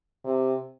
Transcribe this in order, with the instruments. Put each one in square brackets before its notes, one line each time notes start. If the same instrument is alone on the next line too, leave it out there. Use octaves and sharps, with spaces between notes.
[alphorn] C3